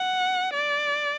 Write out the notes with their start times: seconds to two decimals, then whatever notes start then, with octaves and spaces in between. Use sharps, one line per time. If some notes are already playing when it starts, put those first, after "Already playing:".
Already playing: F#5
0.54 D5